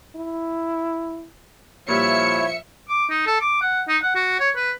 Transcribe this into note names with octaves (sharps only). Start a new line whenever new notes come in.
E4
A#2 F3 G3 E4 C#5 E5 C#7
D6
D#4
A4
D6
F#5
D#4
F#5
F#4
C#5
B4